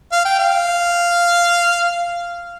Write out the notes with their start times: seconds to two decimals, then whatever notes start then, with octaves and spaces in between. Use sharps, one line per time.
0.12 F5
0.25 G5
0.39 F5